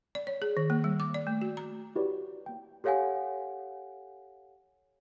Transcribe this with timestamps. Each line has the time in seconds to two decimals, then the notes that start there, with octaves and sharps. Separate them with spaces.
0.15 D5
0.27 C#5
0.42 G#4
0.57 D#3
0.70 A#3
0.84 G3
1.00 D6
1.14 D5
1.27 A3
1.42 F#4
1.57 A#5
1.95 E4 F#4 G4 B4 C#5 D5
2.46 A#3 G5
2.84 G4 A4 C#5 F5 F#5 G#5